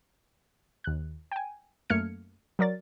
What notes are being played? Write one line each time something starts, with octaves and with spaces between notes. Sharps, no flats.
D#2 F#6
G5 G#5
F#2 A3 A#3 F6 G#6 C#7
F#3 A#4 D5 A6